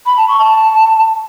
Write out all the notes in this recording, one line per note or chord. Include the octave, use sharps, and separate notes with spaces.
B5
A5
C#6
A5